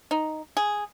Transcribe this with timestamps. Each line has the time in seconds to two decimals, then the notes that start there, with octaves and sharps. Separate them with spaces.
0.11 D#4
0.57 G#4